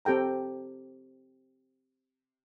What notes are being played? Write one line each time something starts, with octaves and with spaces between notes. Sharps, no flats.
C4 G4 A4 G5 A#5